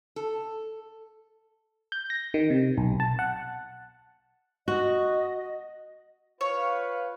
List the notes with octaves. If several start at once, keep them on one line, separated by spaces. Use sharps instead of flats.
A4
G6
A#6
D#3
C3
B1
A5
F#5
F#4 D#5
F4 B4 C#5 F5